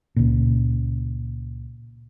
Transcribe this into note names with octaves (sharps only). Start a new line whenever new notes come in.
C#2 A#2